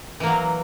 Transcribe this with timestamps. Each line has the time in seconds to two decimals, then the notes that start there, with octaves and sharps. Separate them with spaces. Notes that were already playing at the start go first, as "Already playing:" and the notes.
0.20 E3
0.23 A#3
0.26 F#3